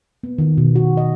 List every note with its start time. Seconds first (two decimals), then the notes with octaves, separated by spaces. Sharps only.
0.23 B3
0.38 D#3
0.57 B2
0.76 F#4
0.97 D#5